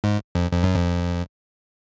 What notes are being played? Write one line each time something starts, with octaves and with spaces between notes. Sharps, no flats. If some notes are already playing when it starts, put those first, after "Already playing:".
G#2
F2
F2
F#2
F2